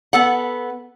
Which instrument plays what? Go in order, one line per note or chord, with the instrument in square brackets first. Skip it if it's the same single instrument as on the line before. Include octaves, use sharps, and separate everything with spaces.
[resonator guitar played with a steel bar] B3 A4 F#5